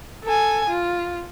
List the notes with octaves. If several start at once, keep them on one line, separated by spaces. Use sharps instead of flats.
A4 G#5
F4